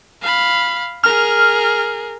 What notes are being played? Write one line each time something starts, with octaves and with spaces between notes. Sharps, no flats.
F5 B5
G#4 A#4 F6